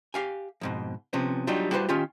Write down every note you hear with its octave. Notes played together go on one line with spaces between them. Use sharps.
G4 F5 G#5
F2 G#2 B2
C3 F3 B3 C#4
F#3 G3 D4 D#4 F4 G4
G3 E4 F#4 B4 C5 A5
D#3 C#4 F4 G4